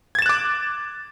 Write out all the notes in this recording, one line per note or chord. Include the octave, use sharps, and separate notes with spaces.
D6 F#6 G#6 A6 E7